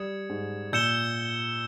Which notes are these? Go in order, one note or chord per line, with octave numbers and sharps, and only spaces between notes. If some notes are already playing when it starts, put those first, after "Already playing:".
Already playing: G3 D#6 G#6 C#7 E7
G#2
A#2 E6 G6 C#7 E7 G7